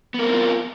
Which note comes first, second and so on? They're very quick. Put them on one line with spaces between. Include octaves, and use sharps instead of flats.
B3 A#4 C4 E4 F4